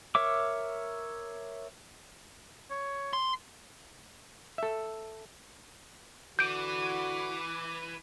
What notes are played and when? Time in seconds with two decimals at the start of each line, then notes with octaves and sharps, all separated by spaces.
0.15 A#4 C#5 E5 D6
2.70 C#5
3.13 C6
4.58 A4 E5
6.39 D3 E3 F#4 D6 G6 D7